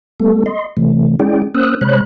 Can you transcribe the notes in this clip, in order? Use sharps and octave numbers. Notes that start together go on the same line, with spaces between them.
G3 A3 B3 A4
D#5 C6
C3 E3 A3
G#3 C#4 E4 G#4 D5 G5
A#3 C#4 C5 D#6 E6 F#6
C3 G#3 C5 C#5 B5 F#6